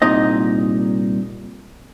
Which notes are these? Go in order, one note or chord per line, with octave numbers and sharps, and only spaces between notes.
C2 A#2 D#4 D#5